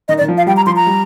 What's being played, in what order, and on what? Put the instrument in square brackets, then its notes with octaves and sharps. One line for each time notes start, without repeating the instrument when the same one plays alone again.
[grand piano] D#3 [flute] D#5
[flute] D5
[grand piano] D#3
F3
[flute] F5
[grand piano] G3 [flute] G5
[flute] A#5
[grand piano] F3 [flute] C6
[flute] A#5
[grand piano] G3